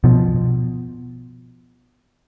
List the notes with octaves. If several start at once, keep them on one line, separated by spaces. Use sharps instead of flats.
B2 F3